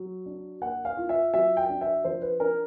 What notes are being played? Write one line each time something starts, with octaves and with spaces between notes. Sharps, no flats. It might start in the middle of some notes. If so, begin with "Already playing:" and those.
Already playing: F#3
D4
A#3 F#5
F5
F4
E5
F#3 E5
G5
D4
E5
F3 C5
B4
D4 A#4